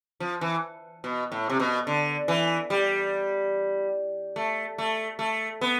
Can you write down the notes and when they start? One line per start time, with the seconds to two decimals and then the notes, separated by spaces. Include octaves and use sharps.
0.20 F3
0.41 E3
1.04 B2
1.32 A2
1.50 C3
1.60 B2
1.87 D3
2.28 E3
2.70 G3
4.36 A3
4.78 A3
5.19 A3
5.61 B3